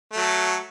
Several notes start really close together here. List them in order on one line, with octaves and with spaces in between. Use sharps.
A3 F#3 A4